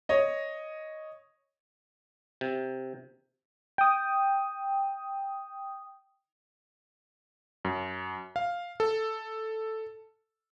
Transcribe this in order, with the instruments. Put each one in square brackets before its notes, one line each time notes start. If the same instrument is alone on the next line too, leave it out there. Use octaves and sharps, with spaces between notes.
[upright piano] C#5 D#5
[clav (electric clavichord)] C3
[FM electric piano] G5 D#6
[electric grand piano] F#2
F5
A4